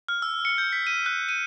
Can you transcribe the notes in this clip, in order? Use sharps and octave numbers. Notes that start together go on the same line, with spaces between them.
F6
E6
C#7
G6
B6
D#7
F#6
D#7